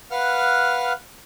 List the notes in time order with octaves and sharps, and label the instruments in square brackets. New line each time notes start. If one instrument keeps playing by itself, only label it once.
[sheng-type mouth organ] B4 F5 F#5 F6